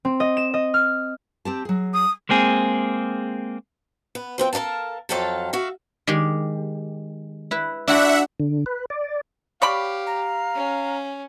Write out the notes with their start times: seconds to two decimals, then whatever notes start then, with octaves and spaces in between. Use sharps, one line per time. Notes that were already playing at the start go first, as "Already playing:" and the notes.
0.05 C4
0.20 D#5
0.37 E7
0.54 D#5
0.74 F6
1.45 C4 G4 A5
1.65 F#3 G#4
1.94 D#6
2.29 G#3 A#3 C4 G#4
4.15 B3
4.38 F3 C4 A#4 G5
4.53 A4 A#4 D#5 F5 A5
5.09 F2 F#3 A4 F5 G5 A5
5.53 F#4 E5 F5
6.07 D#3 G#3 G4
7.51 E4 B4
7.87 D4 E4 F#4 E5 F#5
8.40 D3
8.66 B4
8.90 D5
9.62 G4 C#5 D5 F5 B5
10.06 A#5
10.55 C#4